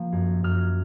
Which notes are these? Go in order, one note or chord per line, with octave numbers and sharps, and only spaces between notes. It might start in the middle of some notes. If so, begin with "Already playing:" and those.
Already playing: F3 A#3
F#2
F#2 F6